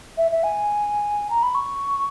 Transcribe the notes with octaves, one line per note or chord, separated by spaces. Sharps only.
E5
E5
G#5
A#5
B5
C#6